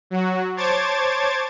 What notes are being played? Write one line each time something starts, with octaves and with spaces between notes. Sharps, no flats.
F#3 F#4
C5 C#5 A5 D6 G#6 A6